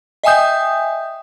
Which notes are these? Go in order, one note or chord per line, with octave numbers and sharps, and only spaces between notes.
D#5 E5 G5 G#5 D#6 G6